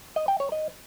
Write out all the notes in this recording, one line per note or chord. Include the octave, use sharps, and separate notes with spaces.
D#5
G5
C#5
D#5